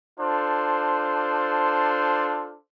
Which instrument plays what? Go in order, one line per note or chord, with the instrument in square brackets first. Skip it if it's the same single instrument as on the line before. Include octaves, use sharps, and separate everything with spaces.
[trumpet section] D4 F4 A4 C5